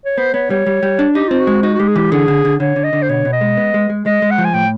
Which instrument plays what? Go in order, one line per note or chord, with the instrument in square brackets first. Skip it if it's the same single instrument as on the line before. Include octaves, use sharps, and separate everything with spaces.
[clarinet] C#5
[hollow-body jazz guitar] B3 [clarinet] C5
[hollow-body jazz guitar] B3 [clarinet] C#5
[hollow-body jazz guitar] G3 [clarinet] C#5
[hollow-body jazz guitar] G3
G3
D4
[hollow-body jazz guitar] D#4 [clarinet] G4
[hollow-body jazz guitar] C4 [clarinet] F4
[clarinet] F#4
[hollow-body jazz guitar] G#3
[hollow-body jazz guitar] D#4 [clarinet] F#4
[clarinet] F#4
[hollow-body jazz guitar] G#3 [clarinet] G4
[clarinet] G#4
[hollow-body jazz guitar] E3 [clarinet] G4
[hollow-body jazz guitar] D3 [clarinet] G#4
[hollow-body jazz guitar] D3
D3
[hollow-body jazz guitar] D3 [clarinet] C#5
[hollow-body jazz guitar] D3
[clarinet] D#5
[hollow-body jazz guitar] D3
[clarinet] C5
[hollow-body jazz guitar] B2 [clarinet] C#5
[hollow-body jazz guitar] B2
[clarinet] D#5
[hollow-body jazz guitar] G#3
B3
G#3
G#3
[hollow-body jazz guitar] G#3 [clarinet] D#5
[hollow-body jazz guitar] G#3
[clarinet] F#5
[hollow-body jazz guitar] F3
[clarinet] G#5
[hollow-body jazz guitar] A2 [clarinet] G5